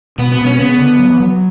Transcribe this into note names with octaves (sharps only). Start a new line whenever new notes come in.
B2 B3
B3
B2
C#4
C#3 B3
D3
F#3
E3
F#3